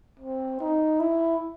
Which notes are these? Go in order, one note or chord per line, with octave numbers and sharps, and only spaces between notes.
C4
D#4
E4